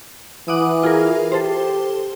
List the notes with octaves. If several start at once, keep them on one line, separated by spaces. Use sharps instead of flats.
E3 F#5 D6 D#6
F4 G#4 A#4
G4 A4 C5